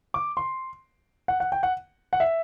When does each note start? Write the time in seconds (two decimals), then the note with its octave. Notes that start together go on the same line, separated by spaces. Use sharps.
0.14 D6
0.37 C6
1.28 F#5
1.40 F#5
1.52 G5
1.63 F#5
2.13 F#5
2.20 E5